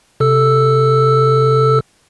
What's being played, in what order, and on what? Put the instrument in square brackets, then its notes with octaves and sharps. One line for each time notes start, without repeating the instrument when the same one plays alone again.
[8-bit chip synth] C3 A4 E6